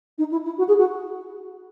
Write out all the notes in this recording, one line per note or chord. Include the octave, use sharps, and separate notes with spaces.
D#4
E4
E4
F#4
G#4
F#4